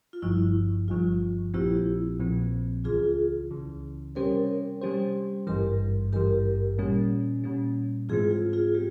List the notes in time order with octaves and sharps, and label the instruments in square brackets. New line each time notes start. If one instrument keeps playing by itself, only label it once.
[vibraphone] F4
[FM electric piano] G1 G2 F3 [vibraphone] E4
[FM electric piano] G1 G2 F3 [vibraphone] F4
[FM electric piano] A#1 A#2 F3 C4 [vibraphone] E4 G4
[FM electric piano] A#1 A#2 F3 C4
[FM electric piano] C#2 C#3 E3 [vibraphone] F4 G#4
[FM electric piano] C#2 C#3 E3
[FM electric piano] C3 G3 C#4 G4 C5 [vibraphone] A#4 C#5
[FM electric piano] C3 G3 C#4 G4 C5
[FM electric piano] G#1 G2 E3 [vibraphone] G4 A#4
[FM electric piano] G#1 G2 E3 [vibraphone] G4 A#4
[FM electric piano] A#2 G3 C#4
A#2 G3 C#4
[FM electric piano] G#2 E3 G#3 C4 [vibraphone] F4 G#4
[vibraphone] F4
F4 G#4
[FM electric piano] C4 [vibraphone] G4